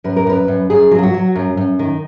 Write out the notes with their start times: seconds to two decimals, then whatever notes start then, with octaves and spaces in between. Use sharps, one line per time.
0.04 F#2 B4
0.16 A#4
0.27 F#2 B4
0.48 F#2
0.70 F#2 G#4
0.91 F#3
0.99 F4
1.03 F#4
1.14 F#3
1.35 F#2
1.57 F#2
1.79 D#3